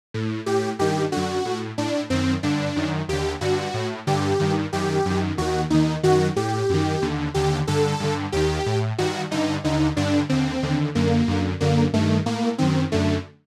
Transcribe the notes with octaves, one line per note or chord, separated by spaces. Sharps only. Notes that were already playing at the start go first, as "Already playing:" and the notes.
A2
A2 G4
G2 D#3 G4
F#2 D3 F#4
A2
A2 D4
F#2 D#3 C4
G2 D3 D4
F#2 D#3
D#2 D3 G4
G2 D3 F#4
A2
G2 D3 G4
G2 D#3
F#2 D#3 G4
F#2 D#3
D#2 D#3 F#4
D#2 D#3 D#4
F#2 D#3 F#4
A2 G4
F#2 D#3
D#2 D3
D#2 D3 G4
G2 D3 A4
G2 D3
D#2 D#3 G4
A2
G2 D#3 F#4
G2 D3 D#4
D#2 D3 D#4
G2 D3 D4
D#2 D3 C4
D#2 D3
F#2 D3 A#3
F#2 D3
F#2 D3 A#3
G2 D#3 A3
A2 A#3
F#2 D#3 C4
F#2 D3 A3